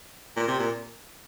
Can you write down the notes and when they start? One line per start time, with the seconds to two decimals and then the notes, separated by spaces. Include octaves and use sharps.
0.36 A#2
0.48 C3
0.60 A#2